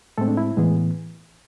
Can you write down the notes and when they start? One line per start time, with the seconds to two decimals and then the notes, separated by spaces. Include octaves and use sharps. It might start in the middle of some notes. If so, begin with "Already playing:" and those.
0.18 A2 G#3 A3 C4 A4
0.28 D4
0.37 E4
0.57 A2 E3 G#3 B3 G#4